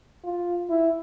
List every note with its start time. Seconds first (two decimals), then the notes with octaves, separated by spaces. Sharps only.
0.24 F4
0.70 E4